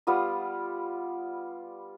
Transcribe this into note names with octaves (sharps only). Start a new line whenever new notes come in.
G3 B3 F4 D#6